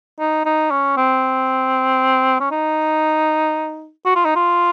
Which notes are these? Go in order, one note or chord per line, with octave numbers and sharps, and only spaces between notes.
D#4
D#4
C#4
C4
C#4
D#4
F#4
F4
D#4
F4